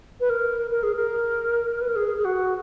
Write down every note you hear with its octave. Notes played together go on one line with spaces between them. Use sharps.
B4
A#4
A#4
G#4
A#4
B4
A#4
G#4
G#4
F#4